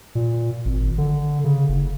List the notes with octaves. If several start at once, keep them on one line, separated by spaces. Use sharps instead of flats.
A#2
G#1
D3
C#3
F#1